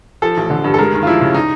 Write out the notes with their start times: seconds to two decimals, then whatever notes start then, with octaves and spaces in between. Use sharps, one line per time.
0.22 F3 A4
0.37 A1
0.50 D3
0.64 G2
0.74 A4
0.78 G#3 A#4
0.92 D#2
1.03 F4
1.07 F3 E4
1.21 C#3
1.34 D#4